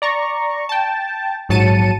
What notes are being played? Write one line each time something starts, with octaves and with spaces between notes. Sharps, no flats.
D5 A#5 C#6
G5 A5
A#1 G#2 F#3 A5 C#7 D#7